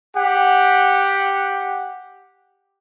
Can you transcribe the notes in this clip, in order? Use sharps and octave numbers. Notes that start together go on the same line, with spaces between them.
G4 F#5